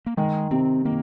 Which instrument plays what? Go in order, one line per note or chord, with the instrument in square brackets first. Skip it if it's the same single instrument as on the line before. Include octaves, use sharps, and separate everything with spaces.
[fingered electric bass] A#3
[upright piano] D#3 [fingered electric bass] G#3
[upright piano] C3 [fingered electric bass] C4
[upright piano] D#3 [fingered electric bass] A#3